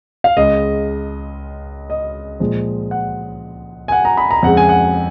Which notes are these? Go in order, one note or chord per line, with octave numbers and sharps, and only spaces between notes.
F5
C#2 C#3 G#3 D#5
D#5
A#2 F3 G#3
F#5
G#5
F#5
A#5
B5
A#5
F2 C#3 G#3 F#5
G#5
F#5